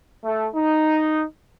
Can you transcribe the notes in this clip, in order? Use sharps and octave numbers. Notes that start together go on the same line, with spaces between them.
A3
D#4